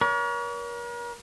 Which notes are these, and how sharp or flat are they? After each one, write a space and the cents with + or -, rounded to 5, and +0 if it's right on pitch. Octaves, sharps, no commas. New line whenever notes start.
A#4 +40 C#5 +40